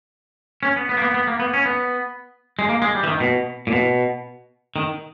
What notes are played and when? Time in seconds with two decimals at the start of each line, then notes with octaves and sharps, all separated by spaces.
0.63 C#4
0.76 B3
0.89 B3
0.97 A#3
1.02 B3
1.14 B3
1.27 A#3
1.40 B3
1.54 C#4
1.65 B3
2.59 G#3
2.69 A#3
2.82 G#3
2.95 G3
3.03 E3
3.08 D#3
3.20 B2
3.67 A#2
3.72 B2
4.76 D#3